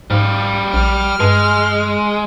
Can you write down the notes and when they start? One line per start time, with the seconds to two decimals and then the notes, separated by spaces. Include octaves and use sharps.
0.11 G#2 G3 F5
0.74 A#1 F6
1.20 G2 G#3